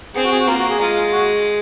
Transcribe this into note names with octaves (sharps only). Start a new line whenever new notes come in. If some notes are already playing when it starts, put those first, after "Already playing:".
C4 G#4
F#4
G#4
F#4
A#3 F4
F#4
G#4
G#3 F4
F#4